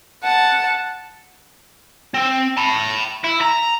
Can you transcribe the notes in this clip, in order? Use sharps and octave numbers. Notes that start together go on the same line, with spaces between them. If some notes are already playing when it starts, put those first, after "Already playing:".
F#5 A5
C4
A5 B5
E4
A#5